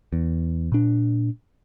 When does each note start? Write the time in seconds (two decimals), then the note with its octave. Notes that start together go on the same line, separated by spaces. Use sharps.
0.13 E2
0.72 A#2 D4